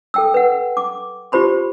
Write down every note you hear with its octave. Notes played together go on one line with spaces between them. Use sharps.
A4 G5 E6
B4 F#5
D6
F4 G4 C5 B5 C6